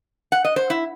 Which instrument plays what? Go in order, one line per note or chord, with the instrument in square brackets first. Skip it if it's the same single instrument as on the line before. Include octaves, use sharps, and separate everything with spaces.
[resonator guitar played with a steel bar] F#5
D#5
C5
E4